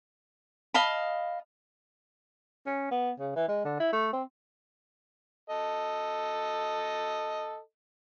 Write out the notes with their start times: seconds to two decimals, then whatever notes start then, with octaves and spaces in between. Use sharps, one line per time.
0.74 D#5 F5 A5 B5
2.66 C#4
2.92 B3
3.19 C#3
3.36 E3
3.48 G#3
3.65 D3
3.80 E4
3.93 A3
4.13 C4
5.50 A4 D#5